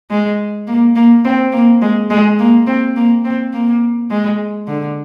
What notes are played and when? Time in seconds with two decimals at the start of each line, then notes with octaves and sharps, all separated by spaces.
0.11 G#3
0.67 A#3
0.96 A#3
1.25 C4
1.53 A#3
1.82 G#3
2.10 G#3
2.39 A#3
2.67 C4
2.96 A#3
3.25 C4
3.53 A#3
4.10 G#3
4.67 D3